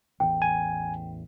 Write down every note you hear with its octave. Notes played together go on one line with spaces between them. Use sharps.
A1 E2 G5
G#5